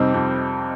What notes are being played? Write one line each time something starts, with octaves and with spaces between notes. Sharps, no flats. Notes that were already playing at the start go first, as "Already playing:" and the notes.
Already playing: F2 C3 G3 C4 D#4
F2